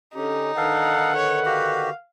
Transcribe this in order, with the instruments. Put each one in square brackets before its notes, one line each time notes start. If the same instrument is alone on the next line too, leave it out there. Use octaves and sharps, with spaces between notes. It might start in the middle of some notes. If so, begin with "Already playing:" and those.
[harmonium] D3 C#4 G4 [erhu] D#4
[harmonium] D3 D#3 B4 [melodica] A4 F5 [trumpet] F#5
[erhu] C#5
[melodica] F#4 G4 [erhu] F5